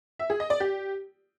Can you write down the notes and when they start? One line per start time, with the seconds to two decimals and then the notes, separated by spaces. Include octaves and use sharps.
0.19 E5
0.30 G#4
0.40 D#5
0.50 D5
0.60 G4